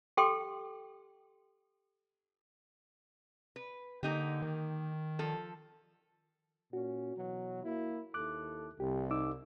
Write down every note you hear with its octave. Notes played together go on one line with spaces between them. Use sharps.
G4 A4 G5 C6 D6
B4
D3 A#3 D#4 G4
D#3
F3 A4
A#2 C#4 F#4
B2 E3 F#3
A#3 E4
D#2 E4 A4 D6 F#6
C2 G4
D#4 D6 E6